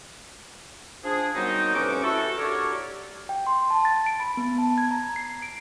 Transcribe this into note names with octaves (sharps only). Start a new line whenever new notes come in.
F3 D4 G#4
D#3 F#3 G3 B3 C4 D#4
A2 C3 C#4 B4 C#6 D6
E4 F#4 A4
D4 F#4 G4 A4 A#4 C#5
G5
C6
A5
A6
D7
B5
B3
A5
G#6
A#5
C7
D7